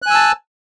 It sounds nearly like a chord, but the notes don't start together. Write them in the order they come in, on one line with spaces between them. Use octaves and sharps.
F#6 G#5 E6 A5